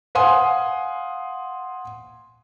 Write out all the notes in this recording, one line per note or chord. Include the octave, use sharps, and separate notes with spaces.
F5 F#5 G#5 C6 D#6